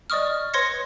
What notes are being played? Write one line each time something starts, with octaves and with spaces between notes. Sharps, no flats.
D5 D#5 C#6 D#6 F6
D#5
B4 C#5 C6 G#6 A#6 C#7